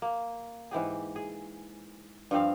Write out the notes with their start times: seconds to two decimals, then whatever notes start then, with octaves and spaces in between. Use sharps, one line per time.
0.02 A#3
0.71 G#2 E3 G4 G#4
1.16 G#4
2.31 G2 F3 C4 F5